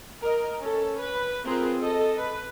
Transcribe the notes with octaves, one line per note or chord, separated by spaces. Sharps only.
A#4 D#5
C#4 A4
B4
C4 F4 G#4 A#4 B4
A4 D#5
B4